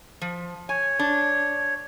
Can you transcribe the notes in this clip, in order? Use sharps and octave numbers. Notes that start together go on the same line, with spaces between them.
F3
C#5 G#5
D4